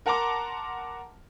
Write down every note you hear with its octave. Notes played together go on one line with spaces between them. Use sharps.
A#4 F#5 A5 A#5 C6 D6